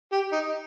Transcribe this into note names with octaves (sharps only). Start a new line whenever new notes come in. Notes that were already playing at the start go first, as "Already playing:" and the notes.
G4
D#4